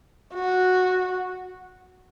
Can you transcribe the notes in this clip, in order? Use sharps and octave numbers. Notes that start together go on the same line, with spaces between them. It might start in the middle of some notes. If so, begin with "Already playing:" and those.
F#4